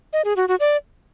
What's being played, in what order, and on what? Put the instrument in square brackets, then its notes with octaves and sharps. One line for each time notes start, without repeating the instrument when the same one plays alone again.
[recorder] D#5
G#4
F#4
F#4
D5